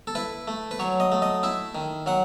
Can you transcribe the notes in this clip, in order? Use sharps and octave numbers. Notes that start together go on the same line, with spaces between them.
A4
E4 B4
A3
B4
F#3 C#5
D#5
A3
D#5
E4 E5
D#3
F#3 F#5